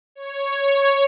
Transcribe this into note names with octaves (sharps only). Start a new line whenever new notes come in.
C#5